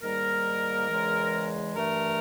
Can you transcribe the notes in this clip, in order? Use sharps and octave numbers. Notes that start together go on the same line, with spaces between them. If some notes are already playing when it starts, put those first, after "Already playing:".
G#2 D#3 G3 A#3 A#4
E2 C#3 E3 G#3
G2 E3 A3 A#4